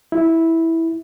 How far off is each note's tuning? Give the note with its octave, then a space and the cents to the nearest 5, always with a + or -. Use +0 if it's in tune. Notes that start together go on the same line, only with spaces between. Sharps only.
E4 -10